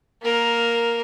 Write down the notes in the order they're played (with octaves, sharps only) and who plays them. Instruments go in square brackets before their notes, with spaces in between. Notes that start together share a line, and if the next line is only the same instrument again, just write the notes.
[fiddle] A#3 A#4